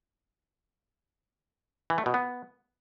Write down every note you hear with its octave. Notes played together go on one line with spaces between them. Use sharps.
E3
A3
B2
B3